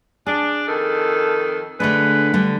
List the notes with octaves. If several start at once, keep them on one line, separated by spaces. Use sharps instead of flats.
D4 G#4
F2 D#3 A4
D3 G#3 A3 D4 B4
D3 G3